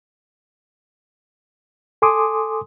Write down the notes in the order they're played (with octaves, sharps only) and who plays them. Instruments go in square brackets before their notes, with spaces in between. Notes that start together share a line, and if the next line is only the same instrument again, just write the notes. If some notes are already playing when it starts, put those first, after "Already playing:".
[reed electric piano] A4 G#5 C6 D6 D#6